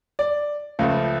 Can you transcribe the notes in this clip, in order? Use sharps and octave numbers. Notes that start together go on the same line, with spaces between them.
D5
C#2 C#3 F3 A3